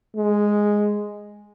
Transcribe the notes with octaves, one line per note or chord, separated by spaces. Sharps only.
G#3